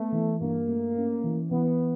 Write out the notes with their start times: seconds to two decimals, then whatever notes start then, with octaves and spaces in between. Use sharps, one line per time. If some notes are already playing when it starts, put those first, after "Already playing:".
Already playing: A3 B3
0.12 E3
0.40 G2 A#3
0.68 A3
0.95 C#4
1.24 E3
1.51 E3 B3